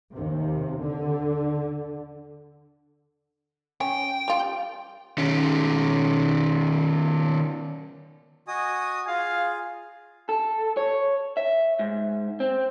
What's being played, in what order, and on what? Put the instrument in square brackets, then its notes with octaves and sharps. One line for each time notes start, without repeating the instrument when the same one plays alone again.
[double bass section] D#2 C3
D3
[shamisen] C#4 [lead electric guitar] G5
[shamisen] G3 F4
[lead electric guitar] D#3 C#4
[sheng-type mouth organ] F#4 D#5 D#6 [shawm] G#5
[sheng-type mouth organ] F4 G#4 [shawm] F5
[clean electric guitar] A4
C#5
E5
G#2
C4